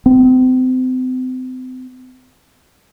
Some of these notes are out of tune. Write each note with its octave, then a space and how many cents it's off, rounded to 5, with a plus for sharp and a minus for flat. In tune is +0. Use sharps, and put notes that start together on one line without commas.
C4 -35